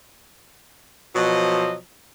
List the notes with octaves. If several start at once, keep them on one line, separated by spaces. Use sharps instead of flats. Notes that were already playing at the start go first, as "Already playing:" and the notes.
B2 F3 F#3 D#5